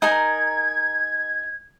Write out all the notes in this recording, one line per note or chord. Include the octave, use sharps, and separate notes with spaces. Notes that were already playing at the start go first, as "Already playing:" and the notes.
D#4 G#4 A#4 G#6